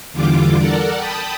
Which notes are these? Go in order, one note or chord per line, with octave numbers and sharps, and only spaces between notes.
E2 D3 E3 G3 F4 D6
A4 A#4 D5 F#5
G5 A5 B5 D#6